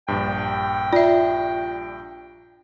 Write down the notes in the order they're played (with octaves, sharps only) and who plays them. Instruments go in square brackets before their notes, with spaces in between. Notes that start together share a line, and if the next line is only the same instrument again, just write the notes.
[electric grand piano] A#1 G2 [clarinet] G5
[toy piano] F4 [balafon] D5 E5